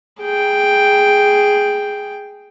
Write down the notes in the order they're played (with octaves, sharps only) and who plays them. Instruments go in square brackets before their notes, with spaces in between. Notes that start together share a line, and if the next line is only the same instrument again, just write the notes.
[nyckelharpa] G#4 G5